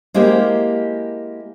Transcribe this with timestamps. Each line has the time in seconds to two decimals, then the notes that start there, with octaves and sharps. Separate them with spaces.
0.14 G#3 A#3 E4 G4 A#4 C5